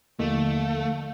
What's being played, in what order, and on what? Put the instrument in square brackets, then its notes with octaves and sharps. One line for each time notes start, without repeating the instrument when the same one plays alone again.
[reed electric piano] D#2 A#3 [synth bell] D3 F3 D7 [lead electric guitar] A3 [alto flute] F5